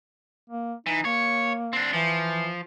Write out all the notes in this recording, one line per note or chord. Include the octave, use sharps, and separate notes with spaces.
A#3
E3 D#4
A#3 C#5
C4 D4
E3 F3